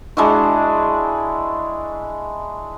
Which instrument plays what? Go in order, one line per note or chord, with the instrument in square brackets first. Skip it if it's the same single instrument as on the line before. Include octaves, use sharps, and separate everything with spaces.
[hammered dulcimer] G#3 D4 E4 F#4